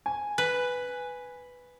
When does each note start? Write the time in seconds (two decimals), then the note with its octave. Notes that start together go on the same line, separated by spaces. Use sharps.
0.06 G#5
0.38 B4